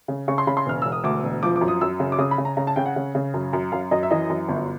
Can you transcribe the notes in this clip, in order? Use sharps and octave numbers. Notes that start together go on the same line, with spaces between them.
C#3
C#3 C#6
C6
C#3 B5
C6
E1 F6
E1 E6
D#6
D2 D6
E1
F3 D6
D6
F#2
D#6
F#2 E6
C#3
D6
C#3 D#6
B5
C#3
A#5
C#3 A#5
A5
C#3 G5
F#5
C#3
C#3
F#2
F#2
F#2 F5
F#2 D#5
E5
E3 D#5
F#2
G1